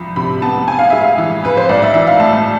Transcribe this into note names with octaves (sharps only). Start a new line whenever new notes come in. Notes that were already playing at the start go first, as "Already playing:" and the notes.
Already playing: C2 F3 B5
C3 B5
B3 A5
F2 G#5
F5
G#3 E5
F5
E3
F2 B4
C5
B1 D5
E5
E3 E5
F5
A2 A5